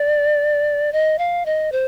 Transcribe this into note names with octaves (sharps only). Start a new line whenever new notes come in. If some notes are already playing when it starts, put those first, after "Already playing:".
Already playing: D5
D#5
F5
D#5
C5